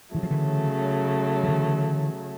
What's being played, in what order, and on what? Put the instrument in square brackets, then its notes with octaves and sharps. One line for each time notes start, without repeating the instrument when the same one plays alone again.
[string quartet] C#3 F#3 A3 [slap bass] E3
[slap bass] F3
D3 E3
F3
D3 E3